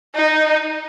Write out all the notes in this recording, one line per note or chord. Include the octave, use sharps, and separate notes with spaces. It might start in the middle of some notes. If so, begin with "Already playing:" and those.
D#4